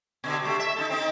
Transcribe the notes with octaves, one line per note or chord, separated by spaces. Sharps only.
B2 D3
C3 A3
E5
D#4 F4 A4
C4 D#4